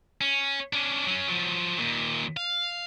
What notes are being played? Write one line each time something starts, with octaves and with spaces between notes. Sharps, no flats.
C#4
C#4 D4
F#3 C#4
F3 F#3
D#2 A#2
F5